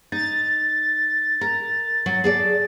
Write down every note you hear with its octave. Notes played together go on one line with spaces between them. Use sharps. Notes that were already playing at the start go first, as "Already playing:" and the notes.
D#4 A6
A#4
F#3
G#4 A4 D5